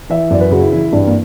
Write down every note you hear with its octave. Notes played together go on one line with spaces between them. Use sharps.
E3 E5
F#2 D5
B4
C#3 F#4
E4
E3 E4
G2 D4
A#3